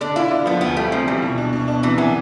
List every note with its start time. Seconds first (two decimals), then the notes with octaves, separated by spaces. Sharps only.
0.01 D3 D4
0.16 E4 F4
0.31 D3
0.46 F3 B3
0.61 D2 B3
0.77 G3 A3
0.92 C3 F3
1.07 E3 G3
1.22 B2
1.38 D4
1.53 B2
1.68 D4
1.83 C3 E3
1.98 E3 B3